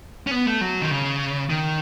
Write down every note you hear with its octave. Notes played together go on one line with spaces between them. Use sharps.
C#4
B3
A3
F#3
D#3
C#3
D#3